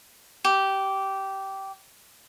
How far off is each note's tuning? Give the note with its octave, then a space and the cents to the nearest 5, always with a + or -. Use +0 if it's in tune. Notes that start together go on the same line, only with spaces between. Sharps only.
G4 -15